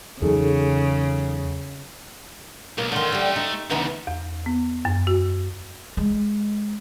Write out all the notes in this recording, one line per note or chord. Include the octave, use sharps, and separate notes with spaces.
E2 C#3 F#3 D#4 G#4 A4
B1 A#3
D3 D#3 A3 C6
D3 G3
D#4
D2 C#3 E3 B3 D#4
E2
B3
F#2
F#4
G#3